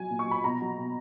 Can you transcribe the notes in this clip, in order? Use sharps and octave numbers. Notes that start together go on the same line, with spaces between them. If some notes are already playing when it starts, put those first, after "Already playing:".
Already playing: F#3 G#5
A#2
C#6
F#3
B5
B2 A#5
F#3
B2